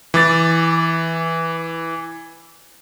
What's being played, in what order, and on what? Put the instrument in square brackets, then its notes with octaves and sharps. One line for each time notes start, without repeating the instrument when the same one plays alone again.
[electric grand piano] E3 D6 A6